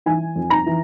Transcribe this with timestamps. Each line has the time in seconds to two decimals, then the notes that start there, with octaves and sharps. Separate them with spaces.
0.06 E3 G#5
0.36 F2
0.50 A#5
0.66 E3